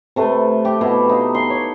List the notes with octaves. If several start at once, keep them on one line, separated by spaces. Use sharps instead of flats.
C3 A3 B4
G4
B2 E4
D#4 F5
C6
C#5